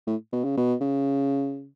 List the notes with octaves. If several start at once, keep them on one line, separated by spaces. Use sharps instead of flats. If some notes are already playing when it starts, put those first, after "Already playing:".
A2
B2
C#3
B2
C#3